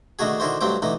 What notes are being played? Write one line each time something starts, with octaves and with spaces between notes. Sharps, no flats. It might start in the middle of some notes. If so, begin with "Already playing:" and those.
D3 D#3 A3 D#4 F#4 G#4
D3 D#3 E4 F#4 C5
G2 F#3 A3 C4 C5 D6
D3 E3 A3 D#4